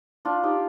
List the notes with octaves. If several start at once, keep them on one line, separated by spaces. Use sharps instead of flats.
D4 F4
D#4 G4